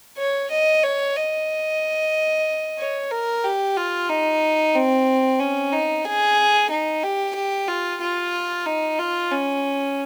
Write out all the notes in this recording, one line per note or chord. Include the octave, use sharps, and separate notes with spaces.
C#5
D#5
C#5
D#5
C#5
A#4
G4
F4
D#4
C4
C#4
D#4
G#4
D#4
G4
G4
F4
F4
D#4
F4
C#4